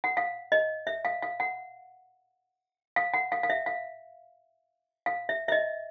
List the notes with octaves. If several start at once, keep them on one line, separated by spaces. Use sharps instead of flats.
F#5
F5
D#5
E5
F5
F5
F#5
F5
F#5
F5
F5
E5
F5
F5
E5
E5
D#5